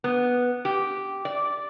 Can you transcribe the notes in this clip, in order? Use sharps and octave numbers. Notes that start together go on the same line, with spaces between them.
B3
G4
D5